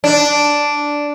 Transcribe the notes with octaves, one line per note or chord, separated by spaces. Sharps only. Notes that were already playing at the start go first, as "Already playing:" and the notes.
D4